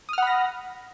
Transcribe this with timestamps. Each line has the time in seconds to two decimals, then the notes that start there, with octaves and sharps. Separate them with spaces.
0.09 D#6
0.13 F6
0.18 F#5
0.22 B5
0.27 A#6